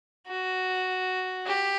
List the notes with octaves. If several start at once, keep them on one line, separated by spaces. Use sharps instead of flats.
F#4
G4